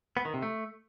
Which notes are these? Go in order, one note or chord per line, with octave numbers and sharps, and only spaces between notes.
B3
D#3
C3
A3